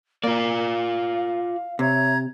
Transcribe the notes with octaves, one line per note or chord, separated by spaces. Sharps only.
A#3 F4 D5 F5
C3 C#5 E5 A#5 G#6